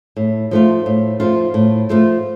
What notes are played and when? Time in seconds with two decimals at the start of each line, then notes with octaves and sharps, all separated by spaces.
0.17 A2
0.51 F3 A3 F4
0.86 A2
1.20 F3 A3 F4
1.54 A2
1.89 F3 A3 F4